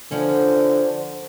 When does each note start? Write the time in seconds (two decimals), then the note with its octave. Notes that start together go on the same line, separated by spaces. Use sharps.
0.11 D3 F3 C#4